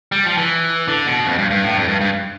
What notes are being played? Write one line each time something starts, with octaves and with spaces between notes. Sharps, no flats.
G3
F3
E3
D3
B2
F2
G2
G2
A2
F2
G2
G2